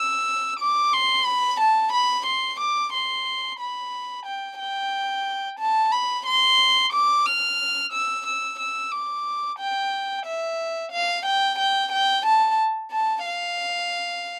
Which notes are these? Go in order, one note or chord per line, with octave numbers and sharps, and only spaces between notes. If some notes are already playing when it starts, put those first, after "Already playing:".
Already playing: E6
D6
C6
B5
A5
B5
C6
D6
C6
B5
G5
G5
A5
B5
C6
D6
F6
E6
E6
E6
D6
G5
E5
F5
G5
G5
G5
A5
A5
F5